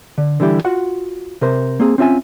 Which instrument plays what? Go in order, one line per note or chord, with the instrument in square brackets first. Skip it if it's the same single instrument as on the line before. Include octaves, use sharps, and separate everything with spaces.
[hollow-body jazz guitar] D3
D3 E3 G3 E4 G4
F4 F#4 F#5
C3 A#4 C5
A#3 C4 G#4
C4 C#4 F4 D5 E5 G#5